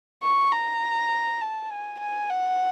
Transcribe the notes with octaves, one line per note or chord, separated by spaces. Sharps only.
C#6
A#5
A5
G#5
G#5
F#5